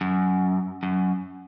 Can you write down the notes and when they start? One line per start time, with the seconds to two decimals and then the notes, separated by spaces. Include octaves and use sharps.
0.01 F#2
0.83 F#2